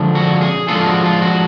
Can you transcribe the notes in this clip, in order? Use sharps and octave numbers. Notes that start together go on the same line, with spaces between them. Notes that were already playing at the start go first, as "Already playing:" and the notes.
Already playing: D3 F3 G#3 D4
F#4
G#4
F3 G#3 B3 D4 F4 A4
F#4
F4
F#4